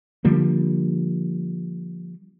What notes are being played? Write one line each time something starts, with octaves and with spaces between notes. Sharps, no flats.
D3 F3 G3 A#3